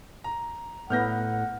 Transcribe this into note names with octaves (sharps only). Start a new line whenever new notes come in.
A#5
A2 A3 B3 E4 F#5 F6 G6 A#6